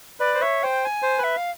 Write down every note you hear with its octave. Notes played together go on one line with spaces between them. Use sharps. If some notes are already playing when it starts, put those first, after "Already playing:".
B4 D5
C5
C#5 E5
C5 G5
G#5
C5
B4
E5
F5